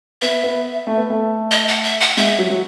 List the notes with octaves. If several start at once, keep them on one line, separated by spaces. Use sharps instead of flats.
B3 E5
B3
A3
B3
A3
D#5
F#5
E5
F#5
G#3 E5
F#3
F#3